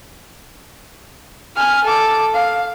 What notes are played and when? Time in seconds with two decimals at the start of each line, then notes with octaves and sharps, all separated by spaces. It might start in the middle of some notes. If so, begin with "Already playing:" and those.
1.55 G#5 F6
1.84 A4 D6
2.34 F5